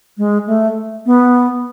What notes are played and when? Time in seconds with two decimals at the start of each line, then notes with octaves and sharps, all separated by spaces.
0.18 G#3
0.47 A3
1.06 B3